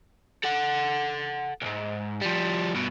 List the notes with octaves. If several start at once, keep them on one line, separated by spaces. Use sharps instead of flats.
A4 F#5
B1 G#2
F3 G3
G2 B2